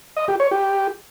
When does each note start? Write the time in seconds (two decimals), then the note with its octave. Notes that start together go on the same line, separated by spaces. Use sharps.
0.17 D#5
0.28 G4
0.40 C#5
0.51 G4